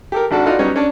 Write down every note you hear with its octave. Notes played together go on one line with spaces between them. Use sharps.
G4 A4 A#4
G#1 D4 F#4 A4
D#4 F4 F#4 A4 D5 D#5
F#3 G3 B3 C#4 D#4
C#4 D4